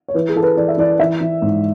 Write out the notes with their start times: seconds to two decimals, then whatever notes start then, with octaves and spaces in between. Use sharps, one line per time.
0.08 C#5
0.14 E3 B4
0.29 G#4
0.36 E3 A4
0.43 B4
0.57 E3 D5
0.68 E5
0.78 E3 D5
1.00 E3 E5
1.21 E3
1.42 G#2